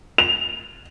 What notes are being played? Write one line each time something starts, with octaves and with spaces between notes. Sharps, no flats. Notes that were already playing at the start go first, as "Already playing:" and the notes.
F7